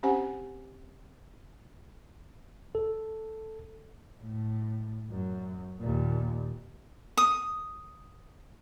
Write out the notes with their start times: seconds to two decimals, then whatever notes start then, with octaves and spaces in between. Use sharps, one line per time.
0.03 C4 C#4 G4 C5 F#5 G#5
2.75 A4
4.21 A2
5.11 F#2
5.80 D#2 A#2
7.17 D#6